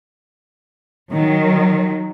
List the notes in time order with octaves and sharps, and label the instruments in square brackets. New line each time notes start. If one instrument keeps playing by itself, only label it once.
[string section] D#3 F#3